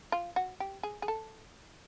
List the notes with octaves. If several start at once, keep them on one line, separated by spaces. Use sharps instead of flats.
F4
F#4
G4
G#4
G#4
A4